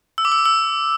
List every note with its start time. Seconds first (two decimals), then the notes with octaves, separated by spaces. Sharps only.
0.18 E6
0.25 D6
0.32 E6
0.39 D6
0.46 E6